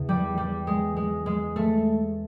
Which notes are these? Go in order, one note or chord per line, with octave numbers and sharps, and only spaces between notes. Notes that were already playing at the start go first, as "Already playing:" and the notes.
Already playing: E2 C#3 E3
G3
G3
G#3
G#3
G#3
A3